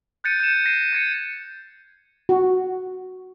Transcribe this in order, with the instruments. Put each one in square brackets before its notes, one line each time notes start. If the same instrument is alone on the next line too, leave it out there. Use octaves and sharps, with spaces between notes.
[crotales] F#6 G6 A6 C#7 D#7
G6 E7
A#6 C7 D#7
G6 G#6 C#7
[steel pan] F#4